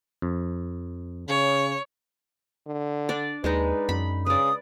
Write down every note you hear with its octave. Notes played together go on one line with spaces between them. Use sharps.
F2
C#3 C#5
D3
D4 D5
D#2 G#3 D4 D#4 B4
F#2 B5
C#3 B4 D5 D#6